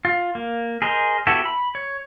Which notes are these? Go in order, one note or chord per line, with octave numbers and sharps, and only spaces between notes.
F4
A#3
G#4 A#4 C5 D#5
B3 E4 F#4 G4 A4
B5
C#5